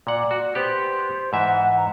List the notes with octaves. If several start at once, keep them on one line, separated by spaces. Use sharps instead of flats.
A#2 D5 F#5
F#4
B3 G4 C5
G#2 E3 E5 F#5
A#5